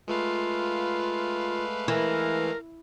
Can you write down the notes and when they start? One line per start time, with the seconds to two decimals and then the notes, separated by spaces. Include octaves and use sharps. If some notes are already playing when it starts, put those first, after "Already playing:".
0.08 G#3 A3 F4 B4 F5
1.88 E3 A#4